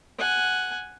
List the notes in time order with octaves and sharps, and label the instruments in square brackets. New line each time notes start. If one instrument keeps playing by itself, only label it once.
[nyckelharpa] F#5 G#5